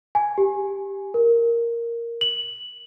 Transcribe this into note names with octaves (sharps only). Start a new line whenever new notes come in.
G#5
G4
A#4
F#7